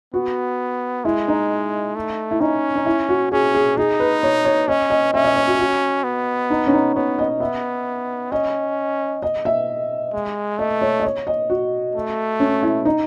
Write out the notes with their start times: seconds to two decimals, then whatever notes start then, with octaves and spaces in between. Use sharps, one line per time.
0.14 B3 F#4
1.05 G#3 E4
1.28 D#4
1.96 A3
2.31 E4
2.41 C#4 D#4
2.76 D#4
2.86 E4
3.09 F#4
3.32 C#4 G#4
3.55 G#4
3.77 D#4 G#4
4.00 B4
4.23 C#5
4.45 C#5
4.68 C#4 D#5
4.90 D#5
5.14 C#4 E5
5.24 D#5
5.36 C#5
5.48 F#4
5.59 F#4
6.04 B3
6.50 D#4
6.67 C#4
6.73 D#4
6.95 B3 C#5
7.19 D#5
7.40 B3 E5
8.32 C#4 D#5
9.22 D#5
9.45 E5
10.13 G#3
10.59 A3 D#5
10.82 C#5
11.00 D#5
11.05 C#5
11.27 D#5
11.50 F#4
11.95 A3
12.40 C#4
12.63 E4
12.85 D#4